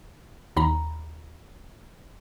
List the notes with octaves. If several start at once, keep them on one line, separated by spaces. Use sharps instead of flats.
D#2 A#5 B5